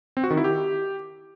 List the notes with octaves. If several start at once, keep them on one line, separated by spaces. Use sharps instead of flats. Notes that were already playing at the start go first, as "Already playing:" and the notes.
C4
F#4
D#3
E4
G4